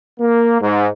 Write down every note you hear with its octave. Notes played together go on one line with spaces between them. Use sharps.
A#3
G#2